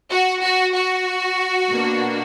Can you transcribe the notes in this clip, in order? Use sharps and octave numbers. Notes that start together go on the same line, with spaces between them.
F#4
F#4
F#4
B2 A#3 D4